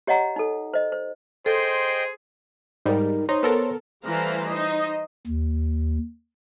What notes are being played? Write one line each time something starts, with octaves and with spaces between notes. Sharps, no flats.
G4 C#5 D#5 F#5 A#5
D#4 A4
C5 D#5
C5
G#4 A4 C5 D#5 G5 C6
G#2 G3 D#4 A#4
D#4 C5 C#5 C6
B3 A4 A#4
E3 G3 A3 C5 F5 A#5
D#4 C5 D#5
D#2